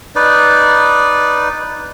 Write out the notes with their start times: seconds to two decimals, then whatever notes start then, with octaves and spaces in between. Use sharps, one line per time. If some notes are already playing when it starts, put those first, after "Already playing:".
0.16 D#4 B4 D5